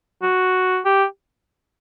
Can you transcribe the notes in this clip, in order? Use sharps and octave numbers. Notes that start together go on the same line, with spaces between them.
F#4
G4